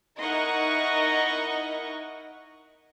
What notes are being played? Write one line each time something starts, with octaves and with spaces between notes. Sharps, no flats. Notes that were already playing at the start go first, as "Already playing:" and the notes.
D#4 E4 A#4 D#5 F#5 C#6